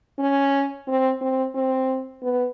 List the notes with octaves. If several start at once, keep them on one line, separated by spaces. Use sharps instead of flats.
C#4
C4
C4
C4
B3